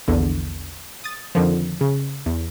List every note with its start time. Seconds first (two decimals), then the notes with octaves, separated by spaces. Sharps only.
0.08 A#1 E2 D3
1.04 D#6 A6
1.35 F2 D3 D#3 F3
1.81 C#3
2.26 E2